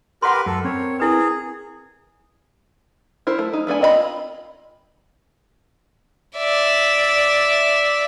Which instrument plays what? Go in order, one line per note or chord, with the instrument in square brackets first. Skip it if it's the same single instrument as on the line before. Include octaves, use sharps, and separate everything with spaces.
[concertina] G4 A#4 B4 [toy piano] F#5 C6
[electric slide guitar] F#2 [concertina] A4
[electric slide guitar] C4 A#4 [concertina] C#5
[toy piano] E4 B4 [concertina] G#4
[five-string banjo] E4 A#4 C5
A3
D#4
A3 B3 D4 G#5
C4 F4 D#5 E5 B5
[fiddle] D5 E5